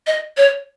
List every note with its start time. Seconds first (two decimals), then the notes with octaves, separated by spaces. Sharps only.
0.07 D#5
0.37 C#5